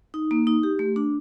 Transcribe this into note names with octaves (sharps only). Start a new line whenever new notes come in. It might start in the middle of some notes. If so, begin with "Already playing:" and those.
D#4
A#3
D#4
G4
A3
D4